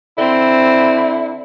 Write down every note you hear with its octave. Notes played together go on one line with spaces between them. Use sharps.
D3 C4 E4